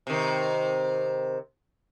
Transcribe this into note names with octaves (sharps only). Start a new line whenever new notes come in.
C3 D#3